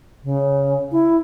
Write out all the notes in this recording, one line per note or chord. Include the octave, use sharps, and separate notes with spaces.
C#3
E4